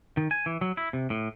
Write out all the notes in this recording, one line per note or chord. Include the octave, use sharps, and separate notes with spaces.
D#3
G#5
E3
F#3
E4
C3
A2